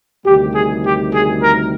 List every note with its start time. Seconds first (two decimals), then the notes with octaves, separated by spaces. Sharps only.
0.25 D2 C3 D#3 G3 G4
0.54 G#4
0.84 G4
1.13 G#4
1.42 A#4